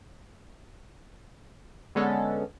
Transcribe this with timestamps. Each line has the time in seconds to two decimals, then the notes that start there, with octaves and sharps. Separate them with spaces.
1.95 D3 G#3 B3 C#4 A4